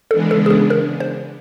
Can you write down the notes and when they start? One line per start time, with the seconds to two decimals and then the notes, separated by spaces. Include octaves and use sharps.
0.11 C#3 E3 G#3 B3 D4 A4
0.31 A4
0.46 G#4
0.50 A4
0.70 A#4
1.00 C5